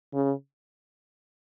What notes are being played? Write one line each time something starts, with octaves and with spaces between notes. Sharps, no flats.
C#3